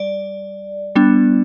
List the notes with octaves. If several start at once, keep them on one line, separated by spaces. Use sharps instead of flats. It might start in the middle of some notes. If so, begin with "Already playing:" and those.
Already playing: G3 D5
G3 B3 D4